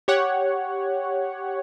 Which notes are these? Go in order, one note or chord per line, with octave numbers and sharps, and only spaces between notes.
G4 C#5 F#5